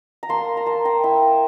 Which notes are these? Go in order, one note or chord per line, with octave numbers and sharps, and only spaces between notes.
A#5
A#3 A5 C6
A#5
A#3 A5 C6
G5 A#5
E4 E5 G5